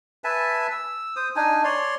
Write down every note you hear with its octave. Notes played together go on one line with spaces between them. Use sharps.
B4 E5 G#5 A5
E6
C5 D#6
D4 D#4 G#5
C#5 D5 C6